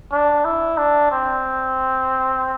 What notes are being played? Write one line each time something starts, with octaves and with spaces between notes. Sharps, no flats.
D4
E4
D4
C4